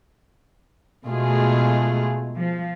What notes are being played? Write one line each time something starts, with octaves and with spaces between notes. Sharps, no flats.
B2 G#3 A3 F4 G#4
F3